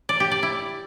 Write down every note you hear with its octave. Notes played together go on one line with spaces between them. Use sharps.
D5
G4
D5
E4